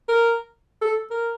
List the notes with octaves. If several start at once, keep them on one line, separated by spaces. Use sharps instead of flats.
A#4
A4
A#4